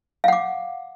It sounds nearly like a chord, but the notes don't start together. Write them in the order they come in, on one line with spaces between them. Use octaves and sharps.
F5 F#5 D6